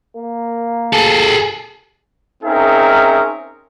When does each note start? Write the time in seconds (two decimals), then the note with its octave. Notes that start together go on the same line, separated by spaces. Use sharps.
0.16 A#3
0.93 G#4 A4
2.43 C4 C#4 D#4 G#4 A#4 E5